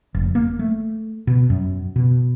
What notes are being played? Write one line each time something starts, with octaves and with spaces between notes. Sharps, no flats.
F1
A#3
A3
B2
F#2
B2